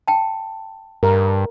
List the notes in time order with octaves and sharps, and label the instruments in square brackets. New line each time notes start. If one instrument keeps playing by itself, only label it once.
[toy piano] G5 A5
[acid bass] G2 [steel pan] A#4